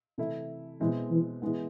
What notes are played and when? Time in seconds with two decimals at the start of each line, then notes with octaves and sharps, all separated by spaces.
0.18 C3 E3 A3 E4
0.80 B2 E3 G#3 C4 E4
1.11 E3
1.42 E3 G#3 B3